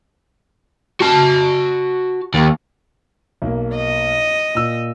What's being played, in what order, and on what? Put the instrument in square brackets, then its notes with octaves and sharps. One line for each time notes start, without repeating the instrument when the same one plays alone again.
[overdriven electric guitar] F#4 A5
D#2
[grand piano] B1 A#3
[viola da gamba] D#5
[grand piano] A#2 E6